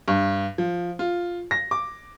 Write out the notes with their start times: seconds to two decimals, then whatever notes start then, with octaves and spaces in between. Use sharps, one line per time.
0.08 G2
0.58 F3
0.99 F4
1.51 A#6
1.71 D6